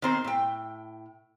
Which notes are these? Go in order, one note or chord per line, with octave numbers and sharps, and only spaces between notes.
D#3 C4 C5
A2 G5